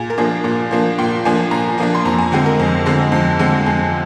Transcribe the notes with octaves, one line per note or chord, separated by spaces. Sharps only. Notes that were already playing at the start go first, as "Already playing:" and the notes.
Already playing: A#2 G#4
A#4
F3 A#3 D4 G#4
A#2
F3 A#3 D4
A#2 G5
F3 A#3 D4 G#5
A#2 A#5
F3 A#3 D4 G#5
C6
F2 A#5
G#5
D3 G#3 C4 G5
A#4
F2
D3 G#3 C4
F2
D3 G#3 C4
F2 G#4